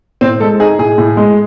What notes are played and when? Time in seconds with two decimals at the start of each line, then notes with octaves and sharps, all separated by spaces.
0.21 A2 C4
0.40 G#3 A4
0.60 D#4 G#4
0.79 A2 G#4
0.98 A2
1.17 G#3